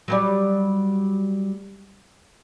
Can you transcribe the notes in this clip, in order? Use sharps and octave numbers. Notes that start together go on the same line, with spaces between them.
F#3 G3 D5